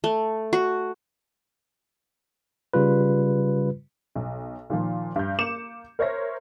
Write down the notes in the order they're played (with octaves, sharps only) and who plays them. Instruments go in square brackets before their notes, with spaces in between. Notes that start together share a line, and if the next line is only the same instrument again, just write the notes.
[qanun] A3
F#4
[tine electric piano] C#3 G3 F4 B4
[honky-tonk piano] B1
A#2 D#3 F3
G2 G6
A#3 D6 C#7 E7
A#4 C5 C#5 E5 A#6